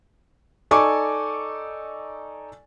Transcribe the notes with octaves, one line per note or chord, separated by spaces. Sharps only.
D#4 A4 D5 G#5 C#6 D6